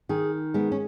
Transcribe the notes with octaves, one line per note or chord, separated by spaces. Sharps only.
D#3 G#4
G#3 B3
C#4